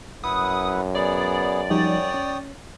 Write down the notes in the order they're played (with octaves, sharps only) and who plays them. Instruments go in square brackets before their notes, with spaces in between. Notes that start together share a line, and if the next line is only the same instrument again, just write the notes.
[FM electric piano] G#1 [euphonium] F#2 [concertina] E4 B4 F#5 [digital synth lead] D#6
[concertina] B3 G#4 [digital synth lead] D5
[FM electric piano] F3 G3 D#4 [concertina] C#5 G5 D#6
[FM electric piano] C#4